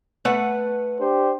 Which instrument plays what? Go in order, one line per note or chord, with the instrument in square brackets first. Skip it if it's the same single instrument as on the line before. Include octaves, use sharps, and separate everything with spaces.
[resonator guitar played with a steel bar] A3 B4 F#5
[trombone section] D4 G4 C5